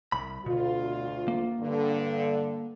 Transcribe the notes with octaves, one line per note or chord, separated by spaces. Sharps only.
C2 B5
D2 B2 F4
A#3
G2 D3